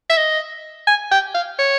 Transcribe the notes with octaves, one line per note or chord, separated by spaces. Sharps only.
E5
D#5
G#5
G5
F5
C#5